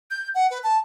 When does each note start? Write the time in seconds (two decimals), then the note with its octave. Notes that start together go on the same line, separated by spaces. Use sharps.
0.11 G6
0.35 F#5
0.51 B4
0.63 A5